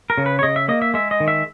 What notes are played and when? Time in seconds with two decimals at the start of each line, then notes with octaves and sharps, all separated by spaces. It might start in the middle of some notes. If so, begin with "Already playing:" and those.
0.10 A#4
0.18 C#3
0.26 B4
0.39 C#5
0.43 C#3 D#5
0.56 E5
0.68 A#3 D#5
0.82 E5
0.94 G#3 E5
1.11 D#5
1.20 D#3
1.28 E5